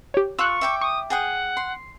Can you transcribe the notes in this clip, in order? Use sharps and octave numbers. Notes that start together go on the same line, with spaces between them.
G4 C#5
F4 A4 C#6 E6 F#6
E5 G5 D6
C#6 D#6
G#4 F#5 G5 D#6
C6